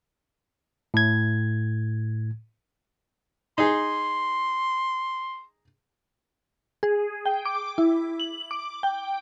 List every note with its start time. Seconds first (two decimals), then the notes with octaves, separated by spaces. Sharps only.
0.94 A2 G#6
3.58 D#4 G#4 C6
6.83 G#4
7.26 G5
7.45 D6
7.78 E4
8.20 F#7
8.51 D6
8.83 G5